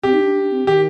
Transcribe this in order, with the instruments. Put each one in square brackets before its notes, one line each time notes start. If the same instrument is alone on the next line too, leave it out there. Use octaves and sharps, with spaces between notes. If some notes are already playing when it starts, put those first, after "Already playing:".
[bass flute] C4 [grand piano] G4
[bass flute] D#4
D4
D4
C4
[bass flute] D#3 [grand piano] G4